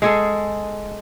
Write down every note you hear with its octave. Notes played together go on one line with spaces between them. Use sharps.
G#3 G#4 A4